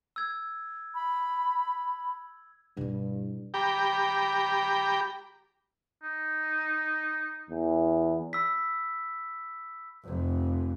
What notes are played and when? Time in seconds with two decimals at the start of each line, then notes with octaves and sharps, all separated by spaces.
0.16 E6 G#6
0.95 B5
2.77 G2 B2 E4
3.54 G4 G5 A#5 B5 D6
6.03 D#4
7.50 E2
8.33 B5 E6 B6
10.04 F1 F2